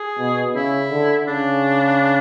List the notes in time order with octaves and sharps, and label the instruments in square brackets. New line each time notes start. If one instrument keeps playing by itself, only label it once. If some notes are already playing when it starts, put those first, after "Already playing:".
Already playing: [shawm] G#4
[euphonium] B2
[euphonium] C#3 [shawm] E4
[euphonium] D3
[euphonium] C#3 [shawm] D4